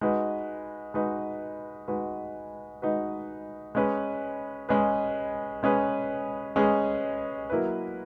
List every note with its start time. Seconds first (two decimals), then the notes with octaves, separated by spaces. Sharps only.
0.01 G#3 D#4 F#4 B4
0.94 G#3 D#4 F#4 B4
1.88 G#3 D#4 F#4 B4
2.82 G#3 D#4 F#4 B4
3.75 G#3 C#4 G#4 B4
4.69 G#3 C#4 G#4 B4
5.63 G#3 C#4 G#4 B4
6.56 G#3 C#4 G#4 B4
7.50 F#3 A#3 E4 B4